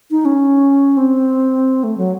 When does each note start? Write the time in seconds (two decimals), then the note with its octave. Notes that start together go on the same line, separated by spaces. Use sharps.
0.11 D#4
0.25 C#4
0.97 C4
1.83 A3
1.98 F#3